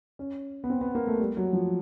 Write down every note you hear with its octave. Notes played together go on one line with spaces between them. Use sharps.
C#4
B3
C4
B3
A#3
A3
G3
F#3
F3